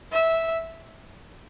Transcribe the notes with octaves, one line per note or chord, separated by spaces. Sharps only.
E5